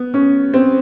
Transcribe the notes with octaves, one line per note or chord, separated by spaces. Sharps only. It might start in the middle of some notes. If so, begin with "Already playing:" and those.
Already playing: B3
C#4
C4